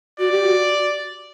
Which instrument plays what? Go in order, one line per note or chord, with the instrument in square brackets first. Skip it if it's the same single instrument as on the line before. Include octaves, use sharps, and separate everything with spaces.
[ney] F#4 [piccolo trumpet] D5
[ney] G4
F#4